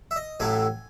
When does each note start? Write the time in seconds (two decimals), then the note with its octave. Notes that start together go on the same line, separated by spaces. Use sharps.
0.11 E5
0.16 D#5
0.40 A1 A2 F#3 A3 E4 G#5